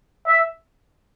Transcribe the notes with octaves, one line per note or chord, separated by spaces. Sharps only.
E5